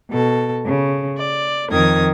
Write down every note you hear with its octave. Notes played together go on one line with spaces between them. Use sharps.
B2 A4
C#3
D5
F2 D#3 A#4 D#6 G#6